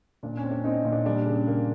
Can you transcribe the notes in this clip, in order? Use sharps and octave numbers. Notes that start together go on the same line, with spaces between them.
A#2 D4
C#4
C4
D4
C4 D#4
A#2
D4
G3 D4
C#3
A#3